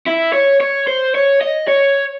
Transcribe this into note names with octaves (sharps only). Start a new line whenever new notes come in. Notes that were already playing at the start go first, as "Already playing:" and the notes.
E4
C#5
C#5
C5
C#5
D#5
C#5